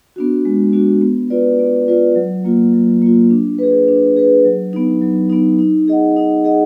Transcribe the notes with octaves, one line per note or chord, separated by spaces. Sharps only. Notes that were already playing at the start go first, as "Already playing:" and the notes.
B3 D4 F#4
G#3
B3 D4 F#4
B3
F4 B4 D5
B3
F4 B4 D5
F#3
A#3 F4
F#3
A#3 F4
D4
G#4 B4
D4
G#4 B4
F#3
B3 D#4
F#3
B3 D#4
D#4
G#4 D#5 F#5
D#4
G#4 D#5 F#5